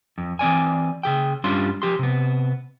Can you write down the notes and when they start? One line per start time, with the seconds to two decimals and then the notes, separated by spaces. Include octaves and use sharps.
0.18 F2
0.39 E3 C4 D5 G#5
1.03 C#3 G#4 G5
1.44 G2 G3 C#4 D4 F4 C6
1.82 F3 G4 C6
1.99 C3 B3